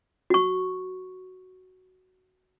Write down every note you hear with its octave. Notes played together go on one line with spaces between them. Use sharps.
F#4 C#6